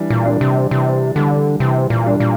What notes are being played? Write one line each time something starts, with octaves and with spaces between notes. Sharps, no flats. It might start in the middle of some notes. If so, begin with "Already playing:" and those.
Already playing: E3 G3 D4
A#2
G3 D4
C3
C3 E3
D3 G3 D4
C3 E3
A#2
G3 D4
A#2